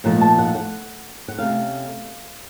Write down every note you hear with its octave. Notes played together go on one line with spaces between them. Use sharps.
A#2 F3 A3 D#4 F#5
A5
F#5
F#5
F#5
C3 D#3 A3 C#4 F5